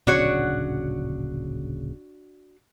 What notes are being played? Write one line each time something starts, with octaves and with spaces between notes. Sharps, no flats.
D1 A#1 C#3 D4 F#4 C#5